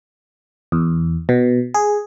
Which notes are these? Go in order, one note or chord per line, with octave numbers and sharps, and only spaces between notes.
E2
B2
G#4